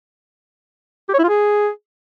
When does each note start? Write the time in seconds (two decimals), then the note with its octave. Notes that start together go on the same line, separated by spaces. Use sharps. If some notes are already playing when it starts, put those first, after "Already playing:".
1.09 G4
1.14 C#5
1.19 E4
1.24 F4
1.29 G#4